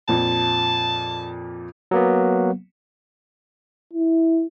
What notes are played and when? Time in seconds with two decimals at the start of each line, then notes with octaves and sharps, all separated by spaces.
0.08 F2 A#2 F3 A5
1.91 F#3 A#3 B3
3.93 E4